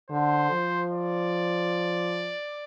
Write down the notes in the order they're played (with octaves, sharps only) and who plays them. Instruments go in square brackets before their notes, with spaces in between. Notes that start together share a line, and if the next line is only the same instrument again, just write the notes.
[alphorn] D3 [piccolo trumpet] C5
[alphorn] F3
[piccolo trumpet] D5